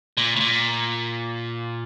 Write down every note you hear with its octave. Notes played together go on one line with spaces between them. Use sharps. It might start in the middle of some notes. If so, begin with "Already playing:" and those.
A#2
A2
A#2